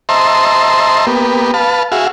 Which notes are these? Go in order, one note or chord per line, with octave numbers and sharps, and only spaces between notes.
C5 D#5 E5 A5 A#5 C6
A#3 B3 G4
B4 F5 A5
F#4 G#4 E5 F5